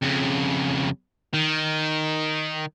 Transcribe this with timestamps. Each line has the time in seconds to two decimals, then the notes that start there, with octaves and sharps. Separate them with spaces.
0.03 F2 C#3
1.34 D#3